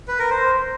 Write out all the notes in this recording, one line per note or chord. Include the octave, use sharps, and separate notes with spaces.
B4
A#4
C5